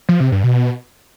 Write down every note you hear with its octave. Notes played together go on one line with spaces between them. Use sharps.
F3
C3
G2
B2